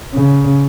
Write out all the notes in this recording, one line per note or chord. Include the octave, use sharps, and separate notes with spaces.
C#3